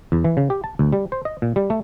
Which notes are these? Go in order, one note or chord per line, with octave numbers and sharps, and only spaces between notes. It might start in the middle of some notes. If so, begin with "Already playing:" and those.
E2
E3
C#3
G4
A5
D2
G3
C5
D#5
A#2
G3
A3